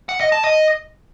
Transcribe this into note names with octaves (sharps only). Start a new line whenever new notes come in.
F#5
D#5
A5
D#5